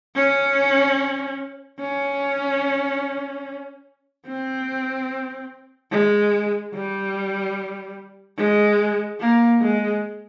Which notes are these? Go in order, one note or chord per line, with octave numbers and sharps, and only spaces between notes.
C#4
C#4
C4
G#3
G3
G#3
A#3
G#3